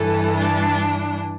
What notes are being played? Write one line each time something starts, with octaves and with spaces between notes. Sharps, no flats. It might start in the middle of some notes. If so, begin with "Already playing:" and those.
Already playing: G2 E3 A4
D4